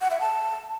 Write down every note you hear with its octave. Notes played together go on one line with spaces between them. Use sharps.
F#5
E5
A5